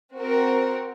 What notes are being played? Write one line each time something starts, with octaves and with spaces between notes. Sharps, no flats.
C4 F#4 A#4